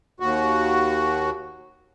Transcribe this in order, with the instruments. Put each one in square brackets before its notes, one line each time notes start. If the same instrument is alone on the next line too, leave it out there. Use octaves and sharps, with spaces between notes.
[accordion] D#2 F#4